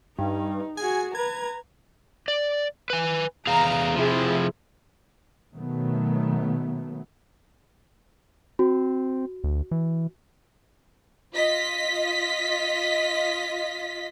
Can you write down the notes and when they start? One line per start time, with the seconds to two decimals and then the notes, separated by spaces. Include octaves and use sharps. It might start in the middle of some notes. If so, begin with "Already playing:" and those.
0.18 G2 D#4
0.77 F#4 G#4 G#5
1.15 B4 A#5 G#6
2.28 D5
2.90 B4 G#5
3.47 E2 G#4 F5 A#5
3.96 C3 F3 E4 G#4
5.53 B2 D#3 F#3 A3 B3
8.59 C4 F#4
9.44 D2
9.71 E3
11.34 F4 D#5 B6